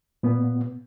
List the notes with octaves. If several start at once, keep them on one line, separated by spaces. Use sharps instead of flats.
A#2 B3